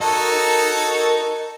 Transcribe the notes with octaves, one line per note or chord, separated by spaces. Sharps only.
F#4 A4 A#4 C#5 D#5 A5 A#5